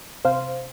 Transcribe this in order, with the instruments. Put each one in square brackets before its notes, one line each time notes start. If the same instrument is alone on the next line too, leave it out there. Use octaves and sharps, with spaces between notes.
[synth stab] C3 C5 F5